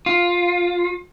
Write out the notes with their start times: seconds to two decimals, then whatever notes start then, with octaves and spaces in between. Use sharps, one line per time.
0.06 F4